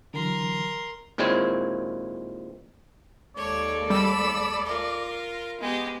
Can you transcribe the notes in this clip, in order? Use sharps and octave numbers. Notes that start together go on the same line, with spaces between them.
D3 E3 F#3 A#4 C6
D#2 A#2 G#3 C4 E4 C#5
D#2 G#3 A4 C#5 D5
G3 B5 E6
F4 A#4
G#3 B3 G4